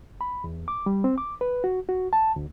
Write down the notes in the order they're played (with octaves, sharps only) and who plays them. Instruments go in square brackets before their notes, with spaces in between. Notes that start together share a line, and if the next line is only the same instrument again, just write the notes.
[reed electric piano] B5
E2
D6
G3
C4
D6
B4
F#4
F#4
A5
D2